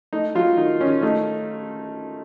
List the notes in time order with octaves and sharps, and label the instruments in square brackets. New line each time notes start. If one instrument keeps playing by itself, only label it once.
[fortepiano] A3 D#4
F#3 F4
D#3 D#4
D#3 C#4
A3 D#4